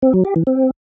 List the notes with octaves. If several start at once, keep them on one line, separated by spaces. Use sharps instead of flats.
C4
F#3
G4
E3
C4